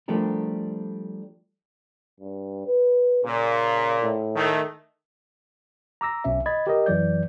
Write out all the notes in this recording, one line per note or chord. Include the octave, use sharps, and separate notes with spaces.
F3 G3 A3 D4 G4 A#4
G2
B4
A#2 C#3
A2
D#3 A3
A#5 D6 E6 A#6
B1 B2 C#4 E5
D#5 B5 G#6 A6
G4 A#4 D#5
F#2 E3 F#3 D5 G6